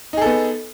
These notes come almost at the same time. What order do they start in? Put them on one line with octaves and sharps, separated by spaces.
D#4 G#4 A4 B3